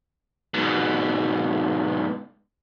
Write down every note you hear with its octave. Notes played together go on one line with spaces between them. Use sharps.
G#2 B2